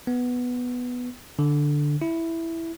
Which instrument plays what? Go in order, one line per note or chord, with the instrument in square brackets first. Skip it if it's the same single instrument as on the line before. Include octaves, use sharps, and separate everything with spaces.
[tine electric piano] B3
D3
E4